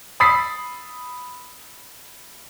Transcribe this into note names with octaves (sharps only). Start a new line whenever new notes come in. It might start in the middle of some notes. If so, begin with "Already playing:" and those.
B5 D#6 E6 A6 B6 C7